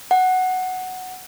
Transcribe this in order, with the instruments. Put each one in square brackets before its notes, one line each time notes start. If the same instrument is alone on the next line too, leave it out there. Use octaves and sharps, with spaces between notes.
[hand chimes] F#5